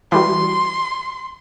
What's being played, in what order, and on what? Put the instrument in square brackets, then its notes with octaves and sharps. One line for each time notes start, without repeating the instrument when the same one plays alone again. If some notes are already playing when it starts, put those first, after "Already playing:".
[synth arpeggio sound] E3 G3 F#4 [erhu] C6